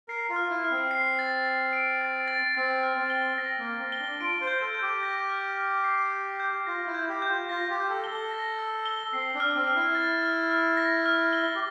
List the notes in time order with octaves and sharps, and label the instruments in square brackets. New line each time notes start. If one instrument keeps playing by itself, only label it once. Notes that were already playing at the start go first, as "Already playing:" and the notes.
[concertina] A#4 [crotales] C7
[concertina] F4
[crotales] F6
[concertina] E4
[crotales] F6
[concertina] C4
[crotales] C7
A6
A6
D7
A6
A6
[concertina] C4 [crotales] A6
[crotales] F6
[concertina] C4
[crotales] G7
[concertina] C4 [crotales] A#6
[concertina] A#3
[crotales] F6
[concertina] C4
[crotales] G7
[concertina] D4
[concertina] F4 [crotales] D7
[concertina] C5
[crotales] G6
[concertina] A4
[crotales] G6
[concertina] G4
[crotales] A#6
F6
F6
C7
G6
G6
[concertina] F4 [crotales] A#6
[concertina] E4
[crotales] G6
[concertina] G4
[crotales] G6
[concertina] F4
[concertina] F4 [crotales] A#6
[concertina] G4
[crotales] G6
[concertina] A4
[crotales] G7
[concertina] A4
[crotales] A#6
E6
G7
[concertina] C4 [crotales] C7
[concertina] D4
[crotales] F6
[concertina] C4
[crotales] F6
[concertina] E4
[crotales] A6
F6
F6
A#6
F6
G7
[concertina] G4